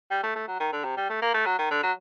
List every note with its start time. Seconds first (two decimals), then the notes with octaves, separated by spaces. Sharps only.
0.11 G3
0.23 A3
0.36 A3
0.48 F#3
0.60 D#3
0.73 D3
0.85 C3
0.97 G3
1.10 A3
1.22 A#3
1.34 A3
1.46 F#3
1.59 D#3
1.71 D3
1.83 F#3